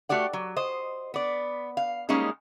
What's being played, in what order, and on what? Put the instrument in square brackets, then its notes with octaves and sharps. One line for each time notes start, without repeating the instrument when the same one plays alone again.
[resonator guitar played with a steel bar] A3 F#4 G4 D5 F#5
F#3
C5 D#5
B3 D5
F5
G3 G#3 A#3 C#4 D#4 G#4